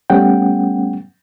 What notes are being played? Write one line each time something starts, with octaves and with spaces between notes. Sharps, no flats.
G3 A3 B3 C#4 F#5 G5